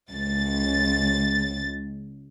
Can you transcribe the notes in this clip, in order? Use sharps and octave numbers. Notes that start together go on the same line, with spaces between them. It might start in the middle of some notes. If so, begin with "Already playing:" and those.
C#2 A6